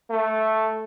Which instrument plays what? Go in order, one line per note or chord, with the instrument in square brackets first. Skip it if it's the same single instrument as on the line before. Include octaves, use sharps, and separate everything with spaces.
[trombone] A3